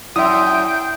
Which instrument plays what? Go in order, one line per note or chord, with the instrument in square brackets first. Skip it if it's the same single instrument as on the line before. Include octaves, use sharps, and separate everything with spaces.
[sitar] F#2 [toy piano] E4 D5 F#5 [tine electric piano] E5 D#6 [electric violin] G5